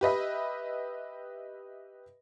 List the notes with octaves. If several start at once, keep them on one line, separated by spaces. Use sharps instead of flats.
G4 B4 D#5 E5